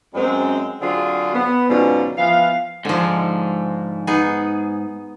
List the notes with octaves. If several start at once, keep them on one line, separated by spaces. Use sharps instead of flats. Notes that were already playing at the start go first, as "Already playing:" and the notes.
F#2 G#3 C4
D3 F#3 C4 F4 F#4 G#4
B3
G#2 B2 D3 F#3 C#4 F4
E3 F3 B3 F5
G#2 D3 F3
B3 D#4 G#4